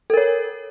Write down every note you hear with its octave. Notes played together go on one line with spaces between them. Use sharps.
A4 A#4 C#5